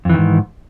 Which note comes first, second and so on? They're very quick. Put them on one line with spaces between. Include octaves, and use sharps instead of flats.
F2 E3 D#3 G#2